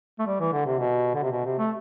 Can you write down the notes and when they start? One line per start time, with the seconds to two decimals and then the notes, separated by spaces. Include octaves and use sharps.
0.19 A3
0.27 G3
0.40 E3
0.53 D3
0.66 C3
0.80 B2
1.15 D3
1.23 C3
1.32 B2
1.45 C3
1.59 A3